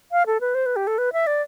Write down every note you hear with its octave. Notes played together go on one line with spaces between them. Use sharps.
F5
A4
B4
C5
B4
G4
A4
B4
E5
D5